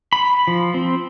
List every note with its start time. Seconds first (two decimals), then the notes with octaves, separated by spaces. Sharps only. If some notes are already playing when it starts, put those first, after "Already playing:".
0.13 B5
0.48 F3
0.74 C4